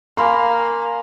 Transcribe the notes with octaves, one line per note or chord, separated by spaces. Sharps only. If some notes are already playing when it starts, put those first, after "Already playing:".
A#3 G#5 B5 C6